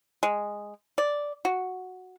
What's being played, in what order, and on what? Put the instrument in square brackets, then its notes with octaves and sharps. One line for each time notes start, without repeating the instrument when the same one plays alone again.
[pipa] G#3
D5
F#4